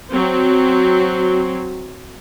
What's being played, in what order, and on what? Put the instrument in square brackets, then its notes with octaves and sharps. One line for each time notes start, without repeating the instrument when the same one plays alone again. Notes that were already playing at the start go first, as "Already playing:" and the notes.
[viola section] F#3 C4